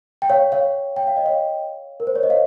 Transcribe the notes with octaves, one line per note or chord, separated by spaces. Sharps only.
G5
C#5 F5
C#5 F5
G5
F5
D#5
C#5 F5
A#4
C5
C#5
D#5
C#5 F5